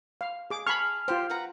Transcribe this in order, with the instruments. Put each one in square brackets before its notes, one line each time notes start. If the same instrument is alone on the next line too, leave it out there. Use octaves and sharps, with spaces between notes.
[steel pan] F5
G#4 D6
[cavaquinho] G#4 A5 [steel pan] B5 C#6 [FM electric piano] F6
[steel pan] F4 C5 [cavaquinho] G4 C6
[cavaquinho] B4 F#5 A#5